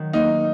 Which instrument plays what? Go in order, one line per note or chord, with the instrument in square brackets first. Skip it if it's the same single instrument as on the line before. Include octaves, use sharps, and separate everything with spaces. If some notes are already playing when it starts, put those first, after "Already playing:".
Already playing: [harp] D#3 F#3
[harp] A#3 [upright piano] D#4